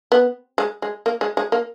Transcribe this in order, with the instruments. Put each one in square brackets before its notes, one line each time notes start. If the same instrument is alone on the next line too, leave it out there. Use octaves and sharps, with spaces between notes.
[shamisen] B3
G#3
G#3
A#3
G#3
G#3
A#3